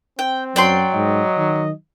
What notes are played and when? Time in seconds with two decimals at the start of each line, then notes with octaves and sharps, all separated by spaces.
0.19 C4 G5
0.56 F#2 F#3 D5 G5 C6
0.94 G#2 D#5
1.37 D#3